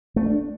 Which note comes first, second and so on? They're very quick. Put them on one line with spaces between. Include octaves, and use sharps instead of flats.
A3 C#4 D4